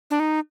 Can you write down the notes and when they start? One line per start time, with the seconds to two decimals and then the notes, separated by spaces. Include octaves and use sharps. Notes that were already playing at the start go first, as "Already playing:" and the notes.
0.11 D4
0.20 D#4